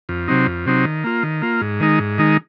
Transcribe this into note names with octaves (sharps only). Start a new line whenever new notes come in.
F2
C3 F#3 C4 D#4
F2
C3 F#3 C4 D#4
D#3
A#3 F4
D#3
A#3 F4
G#2
D#3 G#3 D#4
G#2
D#3 G#3 D#4